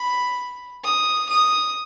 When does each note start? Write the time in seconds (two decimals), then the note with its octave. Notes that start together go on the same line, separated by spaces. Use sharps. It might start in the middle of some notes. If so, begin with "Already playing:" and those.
Already playing: B5
0.84 D#6
1.30 D#6